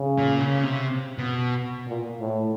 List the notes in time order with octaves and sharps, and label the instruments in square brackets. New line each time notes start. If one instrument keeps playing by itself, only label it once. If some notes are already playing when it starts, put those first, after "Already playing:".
Already playing: [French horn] C#3
[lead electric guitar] A#2
C#3
C3
B2
[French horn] A#2
A2